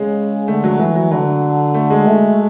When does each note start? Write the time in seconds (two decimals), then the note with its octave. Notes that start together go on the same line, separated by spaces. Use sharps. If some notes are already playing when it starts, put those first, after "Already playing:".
Already playing: C#3 G#3
0.48 D3 A3
0.64 F#3
0.79 E3 F#3
0.95 F#3
1.11 D3 F#3
1.74 A3
1.90 G#3
2.06 A3